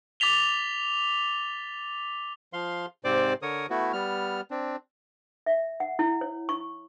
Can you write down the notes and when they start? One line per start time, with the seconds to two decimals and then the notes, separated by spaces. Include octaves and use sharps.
0.20 D6 A6 B6 F7 G7
2.53 F3 F5 C6
3.04 G#2 C3 C4 C5 D5 D6
3.42 D3 A#4 C#5 D#6
3.70 A3 B3 E4 F#4
3.93 G3 B3 F6
4.51 C4 D4
5.46 E5
5.80 F#5
5.99 E4
6.21 C#5
6.49 C#6